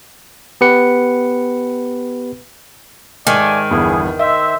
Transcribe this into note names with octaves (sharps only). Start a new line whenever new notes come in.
B3 G4 B4 C#7
G#2 D#3 A3 D5 G#5
G1 E2 G2 G#4
C5 D#5 E5